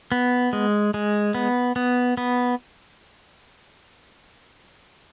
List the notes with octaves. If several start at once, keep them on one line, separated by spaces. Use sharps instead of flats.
B3
G#3
G#3
B3
B3
B3